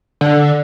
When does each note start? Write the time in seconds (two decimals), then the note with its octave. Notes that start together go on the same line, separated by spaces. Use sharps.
0.21 D3